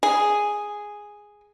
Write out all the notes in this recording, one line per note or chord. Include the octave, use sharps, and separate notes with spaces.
G#4